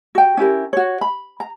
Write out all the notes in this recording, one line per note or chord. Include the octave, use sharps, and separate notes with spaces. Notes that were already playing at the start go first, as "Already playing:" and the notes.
F#4 G5
C#4 E4 G4 A#4
F#4 C#5
B5
A#5